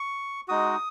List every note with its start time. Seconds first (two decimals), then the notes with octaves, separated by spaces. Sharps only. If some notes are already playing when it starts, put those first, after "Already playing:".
Already playing: C#6
0.48 G#3 D#4 F#4 D#6